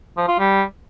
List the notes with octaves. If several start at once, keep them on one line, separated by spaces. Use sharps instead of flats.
F3
F4
G3